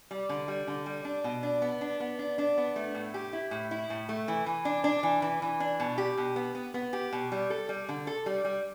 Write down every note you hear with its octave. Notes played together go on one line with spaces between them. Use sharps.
G3
D3
G3
D3
G3
D4
B2
D4
B3
D4
B3
D4
D4
B3
A3
A2
G4
E4
A2
E4
A2
A3
E3
E3
D4
D4
E3
E3
E3
D4
B2
G4
B2
B3
B3
B3
G4
B2
G3
A4
G3
D3
A4
G3
G3